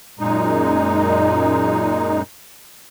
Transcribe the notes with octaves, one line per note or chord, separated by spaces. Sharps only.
F#2 A#2 G#3 D#4